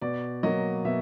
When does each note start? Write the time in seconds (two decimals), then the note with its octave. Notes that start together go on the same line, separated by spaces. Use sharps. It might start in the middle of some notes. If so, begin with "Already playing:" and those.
0.02 B2 D5
0.43 F#3 A#3 D#5
0.85 B2 E5